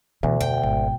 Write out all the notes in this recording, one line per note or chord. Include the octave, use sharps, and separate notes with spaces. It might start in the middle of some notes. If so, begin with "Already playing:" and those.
D2 B2 E3
F2 G5
G#1